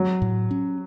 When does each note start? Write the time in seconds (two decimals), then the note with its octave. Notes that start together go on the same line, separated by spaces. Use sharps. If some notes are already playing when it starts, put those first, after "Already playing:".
Already playing: F#3
0.22 A2
0.51 C#4